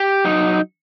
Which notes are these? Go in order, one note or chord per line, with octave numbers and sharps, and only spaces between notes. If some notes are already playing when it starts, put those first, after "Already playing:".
Already playing: G4
F#3 D#4